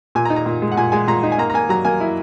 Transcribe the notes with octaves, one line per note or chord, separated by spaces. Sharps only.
A#2 G#5
A#5
D#4
A#5
A#2
G#3
F#5
A#2 G#5
G#3 G#5
A#2 A#5
D#4
G#5
A#3 A#5
A#5
A#3 G#5
F#3 A#5
A#3 G#5
E4